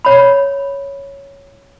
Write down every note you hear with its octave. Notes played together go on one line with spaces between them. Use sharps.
C#5 B5